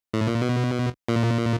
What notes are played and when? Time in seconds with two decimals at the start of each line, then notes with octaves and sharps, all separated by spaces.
0.14 A2
0.27 A#2
0.42 B2
1.08 A#2